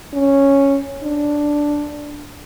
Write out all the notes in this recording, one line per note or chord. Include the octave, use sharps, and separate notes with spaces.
C#4
D4